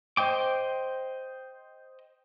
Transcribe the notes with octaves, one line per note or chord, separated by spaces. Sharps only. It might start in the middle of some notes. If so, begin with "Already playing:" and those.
C5 D#5 G5 D6